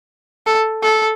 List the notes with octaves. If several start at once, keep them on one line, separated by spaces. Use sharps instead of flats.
A4
A4